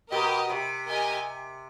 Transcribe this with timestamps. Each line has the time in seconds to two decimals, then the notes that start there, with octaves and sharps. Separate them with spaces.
0.11 B2 G4 A#4 D#5
0.50 C3
0.87 G4 A#4 D#5 G#5